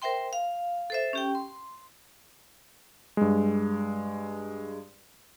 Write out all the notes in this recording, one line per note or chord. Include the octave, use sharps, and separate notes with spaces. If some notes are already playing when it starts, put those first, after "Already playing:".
A#4 C5 E5 G5 C6
F5
A4 C5 E5
C#4 G4 G5
C6
G2 G#3